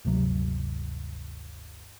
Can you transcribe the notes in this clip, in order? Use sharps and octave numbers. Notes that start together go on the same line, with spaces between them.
G1 D2 C3 F#3